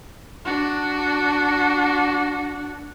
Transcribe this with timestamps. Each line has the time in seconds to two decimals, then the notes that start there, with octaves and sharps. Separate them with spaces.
0.45 D4 F#4